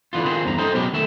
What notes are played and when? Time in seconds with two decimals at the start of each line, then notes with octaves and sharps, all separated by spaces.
0.13 D3 E3 B3 F4
0.25 D#3 B3 C4 F4 G#4
0.44 E2 G2 A#5
0.58 D#4 A4 C5 D#5 G5
0.74 B2 F#3 G#3 C#4 G4 A#4
0.93 D#3 A3 E5